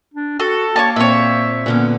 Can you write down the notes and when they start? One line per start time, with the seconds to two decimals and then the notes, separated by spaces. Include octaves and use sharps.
0.14 D4
0.40 F#4 A4
0.76 A#3 C#5 D#5 A5
0.96 A#2 C4 C#5 E5
1.66 A#2 D3 B3 C#4